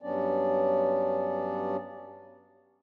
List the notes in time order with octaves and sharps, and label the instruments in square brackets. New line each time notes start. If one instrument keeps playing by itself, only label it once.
[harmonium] G2 F#3 B3 C#4 D4 D5